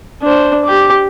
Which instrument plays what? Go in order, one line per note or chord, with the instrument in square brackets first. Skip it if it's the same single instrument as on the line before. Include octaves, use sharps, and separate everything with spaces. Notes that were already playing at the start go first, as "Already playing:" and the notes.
[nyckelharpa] D4 C5
G4 D6